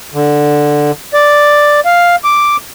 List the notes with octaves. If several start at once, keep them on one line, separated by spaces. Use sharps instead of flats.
D3
D5
F5
D6